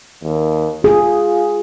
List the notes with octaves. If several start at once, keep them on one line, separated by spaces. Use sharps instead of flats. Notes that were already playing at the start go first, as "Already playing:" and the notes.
D#2
F4 G#4